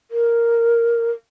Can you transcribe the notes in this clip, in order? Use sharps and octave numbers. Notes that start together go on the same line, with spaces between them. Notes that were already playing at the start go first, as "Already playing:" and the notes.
A#4